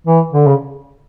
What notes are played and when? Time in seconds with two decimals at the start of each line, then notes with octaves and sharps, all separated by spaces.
0.07 E3
0.33 D3
0.47 C#3